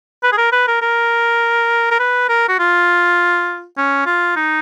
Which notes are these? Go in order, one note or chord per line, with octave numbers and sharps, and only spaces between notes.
B4
G#4
A#4
B4
A#4
A#4
A#4
B4
A#4
F#4
F4
C#4
F4
D#4